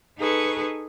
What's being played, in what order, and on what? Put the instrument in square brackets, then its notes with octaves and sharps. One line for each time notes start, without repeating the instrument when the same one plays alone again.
[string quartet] D#4 G#4 A4 B4 C#6